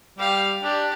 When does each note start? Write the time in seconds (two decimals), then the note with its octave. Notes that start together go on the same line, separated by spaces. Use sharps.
0.19 G3 G4 F5
0.63 D4 G4